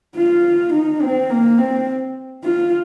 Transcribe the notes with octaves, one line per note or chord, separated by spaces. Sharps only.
F4
D#4
C4
A#3
C4
F4